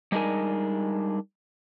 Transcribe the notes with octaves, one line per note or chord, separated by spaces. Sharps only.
G3 G#3 D4 D#4 A#4 G#5